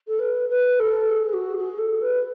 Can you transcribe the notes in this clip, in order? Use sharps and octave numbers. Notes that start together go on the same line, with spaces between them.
A4
B4
B4
A4
G#4
F#4
G#4
A4
B4